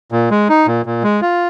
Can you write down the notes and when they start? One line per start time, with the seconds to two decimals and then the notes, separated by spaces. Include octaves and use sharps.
0.12 A#2
0.31 G#3
0.49 D#4
0.67 A#2
0.86 A#2
1.03 G#3
1.22 F4